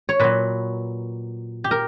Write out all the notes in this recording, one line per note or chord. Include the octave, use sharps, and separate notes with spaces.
C#5
A#2 F#3 B4
G4
A#4